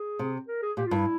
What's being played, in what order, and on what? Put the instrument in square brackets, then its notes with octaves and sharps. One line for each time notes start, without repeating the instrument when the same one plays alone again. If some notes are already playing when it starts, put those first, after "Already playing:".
Already playing: [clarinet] G#4
[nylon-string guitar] C3
[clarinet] A#4
G#4
[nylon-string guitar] A#2 [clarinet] G4
[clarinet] F4
[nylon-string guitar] G2 [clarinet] E4